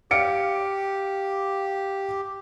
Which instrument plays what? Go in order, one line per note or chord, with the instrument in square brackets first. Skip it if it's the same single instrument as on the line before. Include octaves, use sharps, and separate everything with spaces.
[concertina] G4 [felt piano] F5 C#7 D7